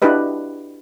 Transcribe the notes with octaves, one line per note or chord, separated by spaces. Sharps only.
D4 E4 F#4 G4 B4 D#5